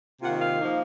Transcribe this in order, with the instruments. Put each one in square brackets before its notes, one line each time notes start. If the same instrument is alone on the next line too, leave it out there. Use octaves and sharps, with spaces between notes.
[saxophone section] C3 D#3 A#3 F4 F#5
F5
F3 A#3 D#4